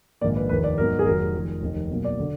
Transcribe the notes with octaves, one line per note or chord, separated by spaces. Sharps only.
A#1 G#2 D#3 A#3 D5
B4
F1 D#2 D#3 B4
D5
G#2 F#3 B3 D#4 A#4
G#4
F1 F2 D#3 F#3 A#4
F1 F2 D#3
F1 D#2 D#3
B1 B2 A#3
D5
D3